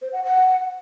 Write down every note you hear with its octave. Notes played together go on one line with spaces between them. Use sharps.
C5
F#5
F#5